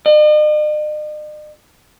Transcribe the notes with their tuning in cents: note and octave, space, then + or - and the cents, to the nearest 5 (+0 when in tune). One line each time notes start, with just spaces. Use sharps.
D#5 -45